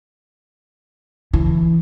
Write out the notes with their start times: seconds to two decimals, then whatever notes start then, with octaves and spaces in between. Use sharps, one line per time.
1.33 E3